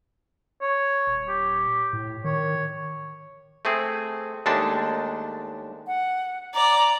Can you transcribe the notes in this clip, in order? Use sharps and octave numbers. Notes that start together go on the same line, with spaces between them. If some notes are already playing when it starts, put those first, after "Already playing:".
C#5
D#1
G4
A2
D#3 C#5
A3 C4 G#4
D#2 G#3 A3 D4 A5
F#5
D5 A#5 D6